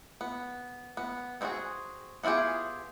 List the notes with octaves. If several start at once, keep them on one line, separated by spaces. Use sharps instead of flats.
B3
B3
C4 D#4 E4 F#4 G#4
B3 E4 F4 G4 G#4